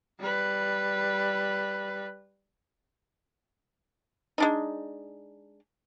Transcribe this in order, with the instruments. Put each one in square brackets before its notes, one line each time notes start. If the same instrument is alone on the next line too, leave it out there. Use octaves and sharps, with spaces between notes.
[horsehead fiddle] G3 B4
[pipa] G#3 D4 D#4